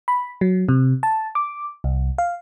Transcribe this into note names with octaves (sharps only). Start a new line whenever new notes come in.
B5
F#3
C3
A5
D6
C2
F5